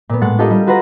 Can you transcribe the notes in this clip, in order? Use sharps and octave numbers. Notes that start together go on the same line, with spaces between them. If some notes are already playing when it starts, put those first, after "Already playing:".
A#2 B3
A2 G#3 F#5 A6 C#7
D4 F4 G4 A4 A#4 D#5
G3 D#5
F4 F#4 B4 C5 F#5 A#5